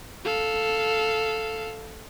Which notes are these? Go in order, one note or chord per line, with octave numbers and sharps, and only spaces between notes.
A4 F5